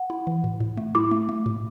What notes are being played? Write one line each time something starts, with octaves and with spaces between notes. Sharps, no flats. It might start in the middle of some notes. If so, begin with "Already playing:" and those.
Already playing: F#5
E4
E3
A2
A2
A3
E4 D6
A3
A3
A2